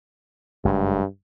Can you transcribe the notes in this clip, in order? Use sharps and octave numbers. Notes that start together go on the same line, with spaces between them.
F#1 G2 G#3